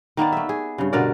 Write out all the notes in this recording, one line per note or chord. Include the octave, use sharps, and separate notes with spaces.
D#3 A#3 B3 D5
A3 E5
G#4
G2 C#3
B2 D3 A#4 D5